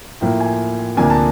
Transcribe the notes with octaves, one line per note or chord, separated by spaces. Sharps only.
A2 F3 A#3 G5
G#5
D2 C3 F3 A#3 D4 G#5
A#5
A5